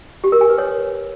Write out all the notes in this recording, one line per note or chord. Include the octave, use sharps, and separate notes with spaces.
G4
A#4
G#5
B4
C#5